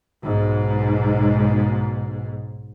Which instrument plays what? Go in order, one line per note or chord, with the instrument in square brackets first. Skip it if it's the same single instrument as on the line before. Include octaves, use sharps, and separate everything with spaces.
[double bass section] B1 G#2